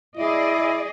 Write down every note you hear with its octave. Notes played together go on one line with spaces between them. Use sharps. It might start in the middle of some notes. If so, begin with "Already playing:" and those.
E4 G#4 D5 D#5